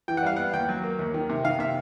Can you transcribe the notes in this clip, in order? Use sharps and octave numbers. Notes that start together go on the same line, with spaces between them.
E3 G5
F#5
G3 F5
B3 F#5
D#2 G5
F#3
A#3
D#2
D#3
C3
D#3 F5
C3 E5